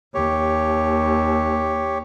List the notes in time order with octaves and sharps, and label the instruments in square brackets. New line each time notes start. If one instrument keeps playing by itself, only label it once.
[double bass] D#2 [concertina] G4 C#5